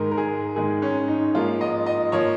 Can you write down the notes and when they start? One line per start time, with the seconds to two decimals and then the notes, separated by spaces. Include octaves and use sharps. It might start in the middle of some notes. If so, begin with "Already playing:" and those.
Already playing: G#2 D#3 G#3 A#4
0.11 A#4
0.17 G#4
0.56 G#2 D#3 G#3 G#4
0.82 C#4
1.08 D#4
1.34 G#2 F3 A#3 F4
1.61 D#5
1.86 D#5
2.12 F3 A#3 C#5